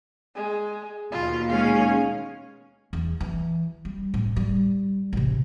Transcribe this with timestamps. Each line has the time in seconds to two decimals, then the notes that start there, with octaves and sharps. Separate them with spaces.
0.35 G#3
1.11 D#2 B2 D#3 F4
1.49 G#3 C#4 C#5 F5
2.93 E2
3.20 E3
3.85 G3
4.14 A2
4.36 G3
5.13 A1 C3